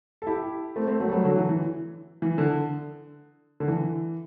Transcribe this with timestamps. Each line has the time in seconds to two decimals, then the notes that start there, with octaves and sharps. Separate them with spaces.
0.22 A4
0.27 E4 G4
0.76 A3 C4
0.87 A3 C4
1.00 F#3 A3
1.08 G3
1.12 F#3 A3
1.24 D3 F#3
1.36 E3
1.49 E3
2.22 E3
2.38 D3
3.60 D3
3.68 E3